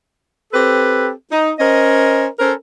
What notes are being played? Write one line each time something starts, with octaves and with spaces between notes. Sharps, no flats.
C4 G4 A4 B4
D#4
C#4 A#4 C5 D#5
C#4 A4 A#4 C5